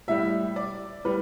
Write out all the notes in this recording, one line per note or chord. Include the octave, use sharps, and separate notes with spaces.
A2 G3 E5
D5
A2 G3 B4